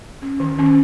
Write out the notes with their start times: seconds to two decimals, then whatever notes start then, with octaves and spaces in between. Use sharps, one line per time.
0.22 C#4
0.40 D#3
0.59 C#4